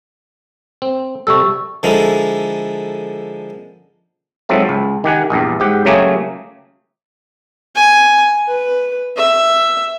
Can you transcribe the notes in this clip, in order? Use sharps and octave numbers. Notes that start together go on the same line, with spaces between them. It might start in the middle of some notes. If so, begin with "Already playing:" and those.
C4
C3 G3 A4 C#6 E6
D3 F3 G#3 E4 A4 A#4
G#2 F3 F#3 C4 A4 E5
C#2
D#3 G4 F#5 G#5
A#1 E2 G2
G#2 G4 F#5
C#3 F#3 A3 A#3 G4 G#4
G#5
B4
E5